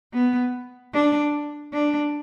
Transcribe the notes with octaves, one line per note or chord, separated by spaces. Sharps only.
B3
D4
D4